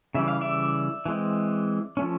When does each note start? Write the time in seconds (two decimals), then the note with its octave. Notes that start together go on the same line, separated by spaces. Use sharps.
0.14 C#3 E3 G3 E5
0.28 F5
0.41 D5 E5
1.06 E3 G#3 C4
1.97 F3 A3 C#4